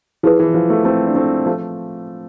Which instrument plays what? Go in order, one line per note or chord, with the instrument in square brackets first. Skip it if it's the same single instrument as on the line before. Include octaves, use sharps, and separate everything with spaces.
[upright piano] F3 [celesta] E4 G#4 B4
[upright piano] E3
F3
F3 A3
A3 C4
D4
A3 C4
F3 A3